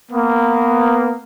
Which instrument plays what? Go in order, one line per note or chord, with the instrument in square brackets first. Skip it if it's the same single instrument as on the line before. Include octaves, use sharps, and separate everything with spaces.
[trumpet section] A#3 B3